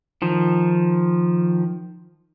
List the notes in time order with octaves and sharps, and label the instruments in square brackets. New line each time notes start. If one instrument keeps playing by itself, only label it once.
[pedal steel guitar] D#3 F3